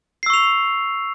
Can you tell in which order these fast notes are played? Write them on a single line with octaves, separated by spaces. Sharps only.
C7 E6 C#6 F7